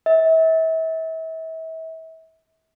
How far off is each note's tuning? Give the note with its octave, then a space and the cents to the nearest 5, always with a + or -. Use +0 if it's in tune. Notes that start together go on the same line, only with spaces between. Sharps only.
E5 -35